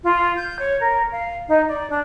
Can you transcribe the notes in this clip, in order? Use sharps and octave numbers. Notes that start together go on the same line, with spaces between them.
F4
G6
C#5
A#4
F5
D#4
D5
D4